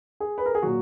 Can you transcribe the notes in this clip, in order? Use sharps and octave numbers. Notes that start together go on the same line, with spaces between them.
G#4
B4
A#4
G#4
A#2 F#3 F#4